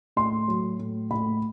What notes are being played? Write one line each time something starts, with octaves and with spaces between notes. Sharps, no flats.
A2 C6
F#3
A2
A2 B5